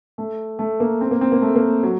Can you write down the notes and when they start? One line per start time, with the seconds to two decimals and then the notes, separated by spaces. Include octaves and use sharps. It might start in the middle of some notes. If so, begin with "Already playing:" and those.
0.18 A3
0.59 A3
0.80 A#3
1.01 C4
1.11 A#3
1.21 C4
1.32 A#3
1.42 A3
1.55 A#3
1.83 F#3